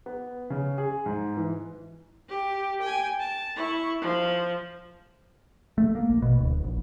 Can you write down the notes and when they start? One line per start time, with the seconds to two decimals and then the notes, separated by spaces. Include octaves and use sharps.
0.06 B3
0.50 C#3
0.78 G#4
1.06 G#2
1.37 E3
2.29 G4
2.81 G5 G#5
3.20 A5
3.56 E4 C#6
4.01 F3
5.78 A3
5.95 A#3
6.09 A#1
6.22 B2
6.39 D1
6.64 A#1